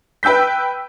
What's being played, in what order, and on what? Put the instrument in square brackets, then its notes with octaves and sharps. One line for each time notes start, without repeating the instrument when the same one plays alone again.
[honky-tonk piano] B4 G5 E6 G6 B6